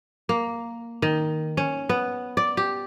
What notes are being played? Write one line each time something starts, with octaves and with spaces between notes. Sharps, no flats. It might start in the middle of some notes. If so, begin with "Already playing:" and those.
A#3
D#3
C#4
B3
D5
G4